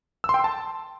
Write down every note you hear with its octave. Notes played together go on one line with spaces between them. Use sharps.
E6
C6
G5
C6
A5